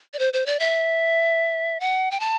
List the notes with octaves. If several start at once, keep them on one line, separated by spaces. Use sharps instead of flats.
D5
C5
C5
D5
E5
F#5
G5
A5